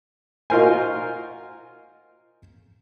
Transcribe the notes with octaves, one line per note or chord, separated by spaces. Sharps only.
D#4 F4 F#4 A#4 C5 G#5